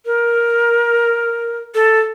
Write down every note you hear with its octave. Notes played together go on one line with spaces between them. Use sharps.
A#4
A4